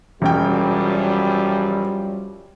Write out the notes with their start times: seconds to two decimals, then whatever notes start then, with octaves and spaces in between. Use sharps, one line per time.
0.22 E1 F#2 F3 G3 C#4 G5